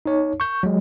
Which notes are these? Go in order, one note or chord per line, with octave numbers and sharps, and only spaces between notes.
D#4 C#5
C#6 G6
F#3 G#3